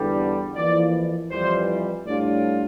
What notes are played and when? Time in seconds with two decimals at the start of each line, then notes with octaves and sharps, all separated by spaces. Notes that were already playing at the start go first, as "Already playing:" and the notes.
Already playing: E2 D3 G3
0.56 F2 E3 A#3 E4 D5
1.30 F2 E3 G3 C5
2.06 A2 G3 D4 F4 D5